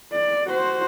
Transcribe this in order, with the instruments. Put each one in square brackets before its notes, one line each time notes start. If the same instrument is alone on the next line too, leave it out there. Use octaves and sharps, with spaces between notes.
[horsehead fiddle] D5
F#4 C5